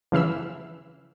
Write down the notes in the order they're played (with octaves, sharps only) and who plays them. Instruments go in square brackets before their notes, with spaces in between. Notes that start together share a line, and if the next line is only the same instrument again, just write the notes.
[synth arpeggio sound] C#3 E3 E5 E6